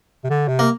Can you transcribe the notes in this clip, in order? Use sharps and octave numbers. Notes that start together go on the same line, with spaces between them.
C3
D3
C3
A#3